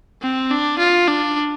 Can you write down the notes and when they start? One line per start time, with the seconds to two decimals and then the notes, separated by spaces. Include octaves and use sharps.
0.22 C4
0.51 D4
0.79 F4
1.08 D4